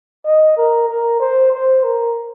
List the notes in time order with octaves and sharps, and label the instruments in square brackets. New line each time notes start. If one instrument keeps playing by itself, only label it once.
[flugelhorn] D#5
A#4
A#4
C5
C5
A#4